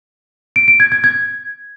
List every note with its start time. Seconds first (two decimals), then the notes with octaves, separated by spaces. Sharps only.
0.56 D7
0.68 D7
0.80 G#6
0.92 G#6
1.04 G#6